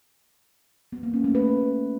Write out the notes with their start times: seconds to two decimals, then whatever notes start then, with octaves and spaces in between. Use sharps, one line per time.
0.93 B3
1.03 A#3
1.14 C#4
1.24 A3
1.35 B4